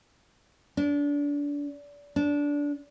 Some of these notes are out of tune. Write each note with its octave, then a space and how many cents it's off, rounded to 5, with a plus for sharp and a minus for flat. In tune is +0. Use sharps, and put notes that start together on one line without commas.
D4 -30
D4 -20